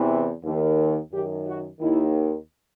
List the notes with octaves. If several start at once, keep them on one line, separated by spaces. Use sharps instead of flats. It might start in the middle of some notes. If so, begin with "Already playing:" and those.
Already playing: E2 C3 E3
D#2 D#3
F#2 D#3 G4
F#4
D#2 D#3 E4